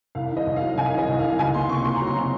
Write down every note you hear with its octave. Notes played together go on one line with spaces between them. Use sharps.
C2 F5
D#3
D#5
C2
F5
F#3
C2 G#5
D#3
D#5
C2
F5
D#3
C#2 G#5
A#3 C6
C3 C#6
A#3 C6
A#5
F#3
C6
C3